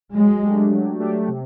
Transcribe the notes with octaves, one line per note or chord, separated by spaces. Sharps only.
F#3 G#3
A3 D4 G4
F#3
A3 D4 G4
C3